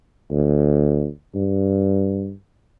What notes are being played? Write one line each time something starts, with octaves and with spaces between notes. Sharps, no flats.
D2
G2